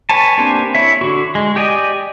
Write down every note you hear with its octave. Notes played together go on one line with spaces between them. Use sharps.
B4 C#5 G#5 A5
A#3 C4 D4 G4 G#5
E4 C#5 E5
D3 F#4
G#3
G4 D5 D#5 G#5